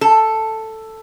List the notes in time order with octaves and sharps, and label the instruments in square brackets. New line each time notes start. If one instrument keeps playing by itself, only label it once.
[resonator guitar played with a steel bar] A4